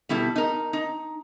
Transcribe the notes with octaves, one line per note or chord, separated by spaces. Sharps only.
B2 G3 E4 A4
D#4 A#4
D#4